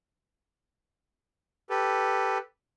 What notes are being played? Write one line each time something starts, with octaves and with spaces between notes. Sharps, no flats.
G4 A4 B4